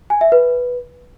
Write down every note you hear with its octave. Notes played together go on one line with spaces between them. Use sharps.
G#5
E5
B4